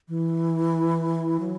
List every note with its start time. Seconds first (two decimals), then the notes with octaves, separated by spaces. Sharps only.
0.08 E3
1.40 F#3